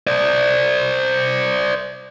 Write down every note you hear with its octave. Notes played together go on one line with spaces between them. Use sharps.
C5 D5